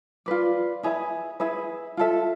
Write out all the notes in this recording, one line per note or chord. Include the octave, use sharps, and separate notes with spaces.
F4 B4 D5
E4 G#4 B4 E5
E4 G#4 B4 E5
F4 A4 E5